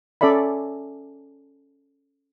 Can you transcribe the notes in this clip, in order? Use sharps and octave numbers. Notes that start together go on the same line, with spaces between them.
C#4 A4 D5 E5 B5